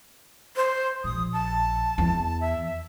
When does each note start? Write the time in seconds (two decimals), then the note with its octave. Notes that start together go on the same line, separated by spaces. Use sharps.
0.56 C5
1.04 A#1 D#6
1.33 A5
1.98 E2
2.41 E5